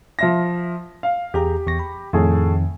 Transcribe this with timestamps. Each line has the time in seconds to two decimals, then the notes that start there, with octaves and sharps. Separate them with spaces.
0.19 F3 E5 A#6
1.03 F5
1.34 E2 G4 G#4 A#5
1.66 E2 C#6 A#6
1.79 B5
2.13 F2 A2 D#3 A3 G#4